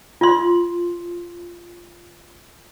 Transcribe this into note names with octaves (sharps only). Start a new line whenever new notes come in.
F4 C6